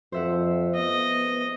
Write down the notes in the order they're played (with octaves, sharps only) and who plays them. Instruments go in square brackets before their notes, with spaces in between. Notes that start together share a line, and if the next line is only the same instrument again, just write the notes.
[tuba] F2 [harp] C5 E5 F#5
[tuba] B3 [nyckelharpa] D#5